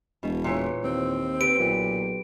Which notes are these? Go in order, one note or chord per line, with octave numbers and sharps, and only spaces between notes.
E1 B2
A#2 E3 C#5
D#2 C4
G4 B4 D7
B1 A#2